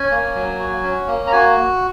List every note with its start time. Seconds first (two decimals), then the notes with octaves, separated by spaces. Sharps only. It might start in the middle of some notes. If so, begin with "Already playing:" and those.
Already playing: C#4 G#5
0.11 A#3
0.35 F#3
0.60 F#4
0.84 C#4
1.07 A#3
1.27 A#5
1.32 F#4 G#5